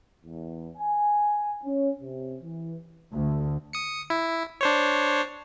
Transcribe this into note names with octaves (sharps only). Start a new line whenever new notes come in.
E2
G#5
C#4
C3
E3
D2
D#6 C#7
E4
D4 C5 C#5